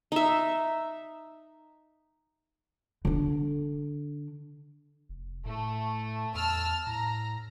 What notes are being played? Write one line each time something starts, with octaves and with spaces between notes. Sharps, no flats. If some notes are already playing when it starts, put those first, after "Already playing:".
D#4 E5
D3 D4
F1
A2 A3
E2 A5 E6 F6
A2 A#5